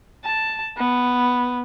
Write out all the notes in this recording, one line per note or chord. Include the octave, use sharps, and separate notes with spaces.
A5
B3